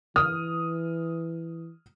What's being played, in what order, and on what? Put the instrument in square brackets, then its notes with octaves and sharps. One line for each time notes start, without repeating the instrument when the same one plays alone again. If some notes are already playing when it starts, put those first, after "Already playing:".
[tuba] E3 [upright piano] D#6 F6